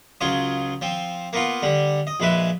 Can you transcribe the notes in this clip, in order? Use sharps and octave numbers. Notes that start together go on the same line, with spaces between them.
C#2 F#3 F4 D#6
F3 C4
A#3 B3 F4
D3 G3
D#5
A#1 G#3 B4 E5